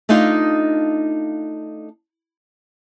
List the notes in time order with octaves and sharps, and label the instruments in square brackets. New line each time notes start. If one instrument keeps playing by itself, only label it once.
[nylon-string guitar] A3 D4 D#4 F4 D#5 F5